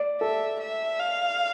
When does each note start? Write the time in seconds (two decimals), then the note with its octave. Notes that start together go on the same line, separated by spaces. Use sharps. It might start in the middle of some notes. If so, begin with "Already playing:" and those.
Already playing: D5
0.21 A4 E5
0.61 E5
0.99 F5